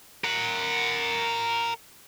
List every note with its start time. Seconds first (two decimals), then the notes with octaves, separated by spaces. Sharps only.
0.24 A#4 F#5